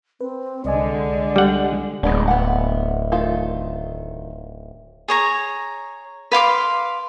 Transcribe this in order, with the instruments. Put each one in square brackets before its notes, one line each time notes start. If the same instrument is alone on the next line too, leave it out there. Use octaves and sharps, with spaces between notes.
[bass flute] C4 [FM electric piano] B4
[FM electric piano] C2 D#5 G#5 [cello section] D3 G#3 [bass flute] D5
[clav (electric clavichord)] G3 F#5
[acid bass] D1 [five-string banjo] G#3 B3 D4
[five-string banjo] B3 F#5
D#3 A3 F4
[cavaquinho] G#4 C#5 A#5
B4 F5 C6 D6